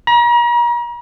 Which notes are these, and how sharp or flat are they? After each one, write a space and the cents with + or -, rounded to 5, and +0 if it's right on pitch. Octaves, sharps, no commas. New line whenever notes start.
A#5 +40